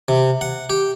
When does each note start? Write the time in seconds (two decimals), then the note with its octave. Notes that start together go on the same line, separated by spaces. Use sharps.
0.08 C3
0.41 F#5
0.70 G4